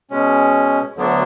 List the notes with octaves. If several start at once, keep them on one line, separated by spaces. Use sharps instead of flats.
B2 G#3 C#4
D2 D3 F#3 B3 D4